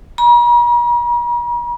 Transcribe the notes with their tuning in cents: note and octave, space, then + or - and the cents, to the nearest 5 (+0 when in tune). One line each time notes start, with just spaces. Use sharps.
A#5 +45